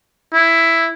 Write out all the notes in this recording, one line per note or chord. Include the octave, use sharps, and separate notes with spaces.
E4